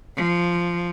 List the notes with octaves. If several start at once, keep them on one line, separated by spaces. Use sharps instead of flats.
F3